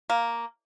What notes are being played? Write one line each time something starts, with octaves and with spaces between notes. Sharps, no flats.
A#3